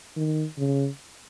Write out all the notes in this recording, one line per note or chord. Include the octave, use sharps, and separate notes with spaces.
D#3
C#3